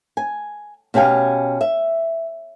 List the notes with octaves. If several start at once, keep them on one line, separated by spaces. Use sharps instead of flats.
G#5
B2 C#4 G4 F5 G#5
E5